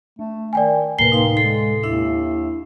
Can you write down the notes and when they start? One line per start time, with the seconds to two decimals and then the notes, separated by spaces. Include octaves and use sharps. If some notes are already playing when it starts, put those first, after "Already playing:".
0.19 A3 D4
0.53 D#3 D5 G5 G#5
0.99 D2 A2 C3 A#3 A#4 B4 C7 G7
1.12 D#4 F5 C6
1.37 G#3 A4 C7
1.83 D#2 D4 E4 E5